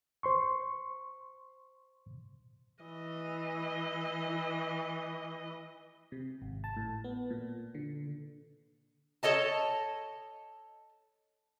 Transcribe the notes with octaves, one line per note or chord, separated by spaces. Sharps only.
C5 C6 C#6
E3 D#5
C3
G#1
A5
A2
B3
A#2
D3
A4 C#5 D#5 A5